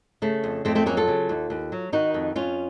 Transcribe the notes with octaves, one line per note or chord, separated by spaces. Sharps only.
C#3 A3
F2
F2 A3 C4
A3 C4
F#3 A#3 C#4
F4 A4
C#3
D#2
D#2
F#3
D#3 D#4 F#4
F2
F2 C#4 F4